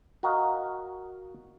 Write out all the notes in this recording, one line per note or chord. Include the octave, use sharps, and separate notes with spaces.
F#4 A#4 D#5 F5